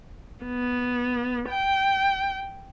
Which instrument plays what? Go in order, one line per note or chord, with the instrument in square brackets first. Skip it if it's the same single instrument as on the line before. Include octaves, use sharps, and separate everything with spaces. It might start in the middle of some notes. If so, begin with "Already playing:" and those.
[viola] B3
G5